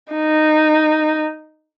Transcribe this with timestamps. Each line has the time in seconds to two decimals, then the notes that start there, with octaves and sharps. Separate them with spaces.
0.13 D#4